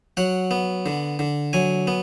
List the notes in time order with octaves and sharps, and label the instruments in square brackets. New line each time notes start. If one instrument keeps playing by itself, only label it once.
[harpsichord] F#3 F#5
B3
D3
D3
F#3 G#5
B3